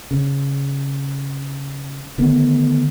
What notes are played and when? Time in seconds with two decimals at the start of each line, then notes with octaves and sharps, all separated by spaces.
0.11 C#3
2.18 D3 D#3 A3 B3